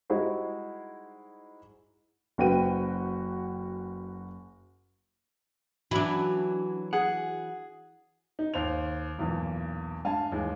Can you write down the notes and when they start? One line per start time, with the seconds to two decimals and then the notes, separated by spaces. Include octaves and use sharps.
0.10 G3 G#3 D#4 E4 F#4 C5
2.38 F#1 C#4 F#4 B4 G5 D#7
5.91 E3 F#3 D4 E4
6.93 G#4 F#5
8.39 D#4
8.54 D#2 C5 F7
9.19 B1 E2 A#2 E3
10.05 G2 F5 G#5 A5
10.32 D#2 E3 G#3